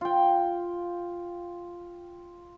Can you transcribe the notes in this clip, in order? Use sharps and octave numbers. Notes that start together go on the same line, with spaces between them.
F4 G5